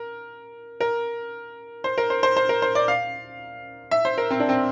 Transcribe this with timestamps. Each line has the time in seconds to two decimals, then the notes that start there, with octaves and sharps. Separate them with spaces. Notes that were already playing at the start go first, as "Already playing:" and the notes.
Already playing: A#4
0.80 A#4
1.84 C5
1.98 A#4
2.10 C5
2.23 C5
2.36 C5
2.49 A#4
2.62 C5
2.75 D5
2.88 F5
3.91 E5
4.05 C5
4.18 A#4
4.31 C4
4.40 D4
4.49 C4